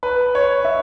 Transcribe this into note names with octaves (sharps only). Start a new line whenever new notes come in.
B4
C#5
E5